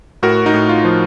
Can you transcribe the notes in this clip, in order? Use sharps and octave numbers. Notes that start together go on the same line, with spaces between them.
A2 F#4 A#4
D#4 F#4
A2
F4
F3